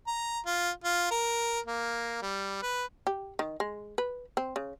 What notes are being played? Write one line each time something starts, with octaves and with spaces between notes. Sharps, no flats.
A#5
F4
F4
A#4
A#3
G3
B4
G4
D#3
G#3
B4
C4
C#3